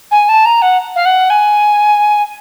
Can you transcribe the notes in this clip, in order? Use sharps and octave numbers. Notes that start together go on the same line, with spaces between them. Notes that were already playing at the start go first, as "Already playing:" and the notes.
G#5
A5
A#5
F#5
F5
F#5
G#5